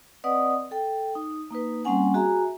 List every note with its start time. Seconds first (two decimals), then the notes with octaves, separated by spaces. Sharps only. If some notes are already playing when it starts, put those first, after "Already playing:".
0.24 C4 B4 D5 D#5 F#5 D#6
0.71 A4 G5
1.15 D#4
1.51 A#3 D#4 B4
1.85 G3 A#3 C4 C#4 F#5 G#5
2.14 F#4 G#4 E5 G#5 A#5